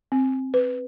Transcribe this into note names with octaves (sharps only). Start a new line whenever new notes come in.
C4
B4